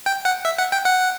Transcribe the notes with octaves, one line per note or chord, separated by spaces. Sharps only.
G5
F#5
E5
F#5
G5
F#5